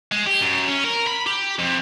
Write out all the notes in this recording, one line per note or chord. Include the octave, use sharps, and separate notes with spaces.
G#3
G4
F#2
C#4
A#4
B5
G4
F2